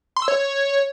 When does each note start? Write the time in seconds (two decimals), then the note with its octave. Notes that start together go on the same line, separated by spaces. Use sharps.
0.16 C6
0.22 E6
0.28 C#5